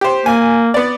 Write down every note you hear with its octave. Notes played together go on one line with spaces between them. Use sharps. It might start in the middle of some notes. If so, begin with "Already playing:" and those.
G4 C5
A#3 G#5
B3 D5